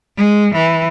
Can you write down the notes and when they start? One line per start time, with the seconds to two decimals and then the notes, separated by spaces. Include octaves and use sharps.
0.18 G#3
0.55 E3